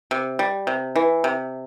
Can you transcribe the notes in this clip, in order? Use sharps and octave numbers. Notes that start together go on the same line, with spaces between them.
C3
G3
C3
E3
C3